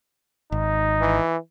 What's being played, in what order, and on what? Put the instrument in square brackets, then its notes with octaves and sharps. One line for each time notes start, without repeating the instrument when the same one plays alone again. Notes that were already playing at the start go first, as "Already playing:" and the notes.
[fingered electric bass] G#1 [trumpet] D#4
[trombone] E3